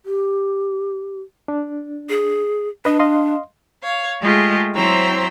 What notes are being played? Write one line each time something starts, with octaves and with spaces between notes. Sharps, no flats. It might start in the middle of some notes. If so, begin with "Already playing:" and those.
G4
D4
G#4
D4 B4 D#5
D#5 F5 C6
C#5 F5
G#3 A3 F4 G4 G#4
F#3 C4 E4 C5 A#5 E6